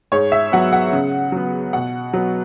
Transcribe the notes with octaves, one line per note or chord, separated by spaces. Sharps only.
G#2 C#5
E5
F#3 B3 F#5
F#5
C#3
F#3 B3
B2 F#5
F#3 B3